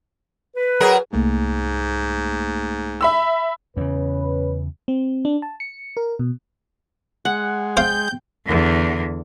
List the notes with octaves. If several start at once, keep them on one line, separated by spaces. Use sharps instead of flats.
B4
F#3 G#4 A#4
C2 G#2 A3 A#3
E5 B5 E6
E2 C#3 C#4 B4
C4
D4
A5
C#7
A#4
B2
G#3 F#5
C5 F5 G5 G6
E2 D3